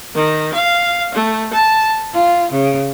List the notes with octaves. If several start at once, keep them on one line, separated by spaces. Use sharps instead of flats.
D#3
F5
A3
A5
F4
C#3